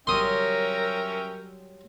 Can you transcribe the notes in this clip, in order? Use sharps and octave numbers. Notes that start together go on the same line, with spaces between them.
F#3 G3 C#4 A#4 E5 G5 C6 D#6